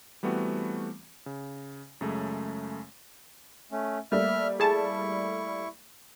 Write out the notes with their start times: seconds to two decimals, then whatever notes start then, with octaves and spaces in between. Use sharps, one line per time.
0.23 E3 G3 A3 B3 C4 F#4
1.26 C#3
2.01 F#2 C#3 G#3 A3
3.72 A3 C#4
4.12 G3 A3 A#3 E5 F6
4.60 E4 G#4 A5 C#6